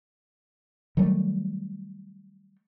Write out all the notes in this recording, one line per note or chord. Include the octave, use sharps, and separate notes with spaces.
D#3 F#3 G3 A3